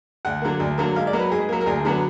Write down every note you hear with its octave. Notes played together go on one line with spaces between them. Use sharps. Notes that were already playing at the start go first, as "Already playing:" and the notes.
D2 F#5
D3 F#3 A#3
D2
D3 F#3 A#3
G#2 F5
D5
F#3 A#3
B4
G#2 G#4
F#3 A#3
A#4
D2 G#4
D3 F#3 B3